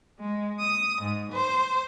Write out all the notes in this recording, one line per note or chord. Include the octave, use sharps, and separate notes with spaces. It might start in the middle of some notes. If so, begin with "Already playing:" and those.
G#3
D#6
G#2
C5